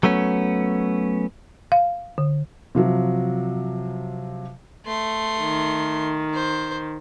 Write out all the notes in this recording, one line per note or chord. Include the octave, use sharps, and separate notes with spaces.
F#3 A3 B3 C#4
F5
D3
C3 F3 F#3
A3 C6
D#3
C5